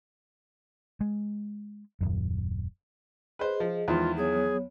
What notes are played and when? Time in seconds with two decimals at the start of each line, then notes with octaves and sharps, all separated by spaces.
1.01 G#3
2.01 D#1 F#2
3.39 G#4 B4 C5 D#5
3.60 F3
3.88 E2 D#3 F3 G#3 F4
4.17 F#3 B3 G#4 C#5